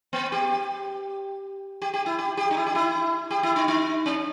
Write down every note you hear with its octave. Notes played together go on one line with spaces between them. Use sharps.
B3
G4
G4
G4
E4
G4
G4
D#4
E4
G4
E4
G4
E4
D#4
D#4
C#4